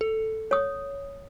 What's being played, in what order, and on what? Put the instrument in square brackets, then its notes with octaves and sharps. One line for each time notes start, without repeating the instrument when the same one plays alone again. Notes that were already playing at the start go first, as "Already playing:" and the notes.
[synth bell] A4
[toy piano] C#5 D#6